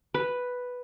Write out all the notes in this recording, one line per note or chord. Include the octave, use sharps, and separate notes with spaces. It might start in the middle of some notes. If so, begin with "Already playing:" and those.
B4